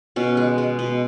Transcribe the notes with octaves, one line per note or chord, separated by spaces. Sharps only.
B2 C#4
G#3
G#3
B2